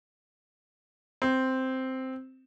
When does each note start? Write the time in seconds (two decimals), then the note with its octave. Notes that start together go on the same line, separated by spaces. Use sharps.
1.22 C4